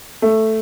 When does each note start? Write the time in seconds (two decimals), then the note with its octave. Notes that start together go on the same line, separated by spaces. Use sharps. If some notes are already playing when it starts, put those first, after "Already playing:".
0.22 A3